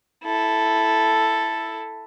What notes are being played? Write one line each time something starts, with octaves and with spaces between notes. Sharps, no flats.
E4 A4